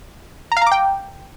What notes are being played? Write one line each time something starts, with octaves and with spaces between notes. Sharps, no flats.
A#5
F5
A#5
D6
G5